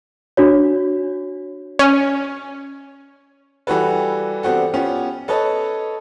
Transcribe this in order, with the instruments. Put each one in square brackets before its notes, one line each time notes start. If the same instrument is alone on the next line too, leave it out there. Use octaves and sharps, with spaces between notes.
[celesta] D4 F#4 C#5
[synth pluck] C#4
[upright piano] E3 G3 F#4 G4 A4 B4
B3 C4 D4 F#4 G4 A4
B3 C#4 F4 G4
A4 B4 C#5 D#5 A5